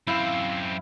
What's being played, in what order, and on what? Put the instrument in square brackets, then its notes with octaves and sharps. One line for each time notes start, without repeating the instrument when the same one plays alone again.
[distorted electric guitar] F#2 C4 [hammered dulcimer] E4 F5